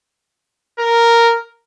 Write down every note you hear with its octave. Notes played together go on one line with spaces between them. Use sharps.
A#4